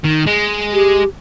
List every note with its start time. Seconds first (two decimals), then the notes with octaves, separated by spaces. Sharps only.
0.04 D#3
0.27 G#3
0.73 G4